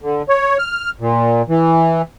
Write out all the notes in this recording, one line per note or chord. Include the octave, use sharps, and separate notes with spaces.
D3
C#5
F6
A#2
E3